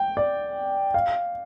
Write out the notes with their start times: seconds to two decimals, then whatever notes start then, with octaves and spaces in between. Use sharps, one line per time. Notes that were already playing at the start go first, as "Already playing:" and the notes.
Already playing: G5
0.17 D5
0.94 F5